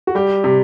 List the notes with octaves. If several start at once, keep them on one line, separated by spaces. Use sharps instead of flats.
F#4
G3 G4
C3